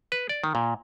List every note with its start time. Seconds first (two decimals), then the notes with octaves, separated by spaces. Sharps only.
0.12 B4
0.29 D5
0.44 D#3
0.55 A#2